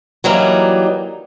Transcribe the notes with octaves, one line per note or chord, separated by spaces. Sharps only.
E3 F#3 G3 A#3 D#4